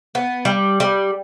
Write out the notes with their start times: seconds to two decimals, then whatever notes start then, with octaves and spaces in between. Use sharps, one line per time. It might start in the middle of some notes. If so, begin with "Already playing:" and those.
0.15 B3
0.45 G3
0.80 G3